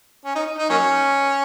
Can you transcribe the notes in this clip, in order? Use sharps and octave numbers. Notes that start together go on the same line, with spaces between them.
C#4
D#4
D#4
D#4
F#3 A#3 C#4